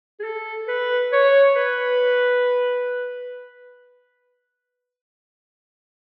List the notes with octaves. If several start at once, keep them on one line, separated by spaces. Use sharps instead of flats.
G#4
A4
B4
C#5
B4